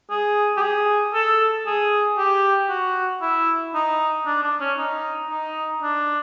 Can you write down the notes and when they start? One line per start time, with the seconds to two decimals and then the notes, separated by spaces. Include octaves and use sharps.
0.10 G#4
0.57 G4
0.62 G#4
1.14 A4
1.67 G#4
2.18 G4
2.70 F#4
3.22 E4
3.74 D#4
4.26 D4
4.43 D4
4.61 C#4
4.78 D#4
5.30 D#4
5.83 D4